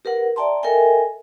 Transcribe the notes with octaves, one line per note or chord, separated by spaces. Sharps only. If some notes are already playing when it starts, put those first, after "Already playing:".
G4 A#4 B4 F#5
D5 E5 G5 A5 A#5 C6
A4 A#4 D#5 E5 G5 G#5